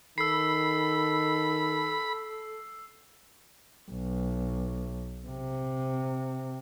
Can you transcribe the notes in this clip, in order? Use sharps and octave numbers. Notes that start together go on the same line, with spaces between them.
D#3 A4 B5 E6 C7
B1
C3